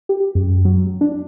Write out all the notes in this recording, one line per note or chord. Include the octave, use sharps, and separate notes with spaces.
G4
F#2
F#3
D4